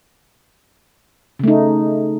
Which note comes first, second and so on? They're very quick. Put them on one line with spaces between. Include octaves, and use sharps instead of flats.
C#3 A3 D#4